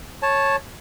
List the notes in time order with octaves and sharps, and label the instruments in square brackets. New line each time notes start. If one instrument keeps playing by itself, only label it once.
[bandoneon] C#5 A5